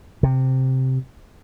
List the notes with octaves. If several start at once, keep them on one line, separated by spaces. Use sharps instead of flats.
C3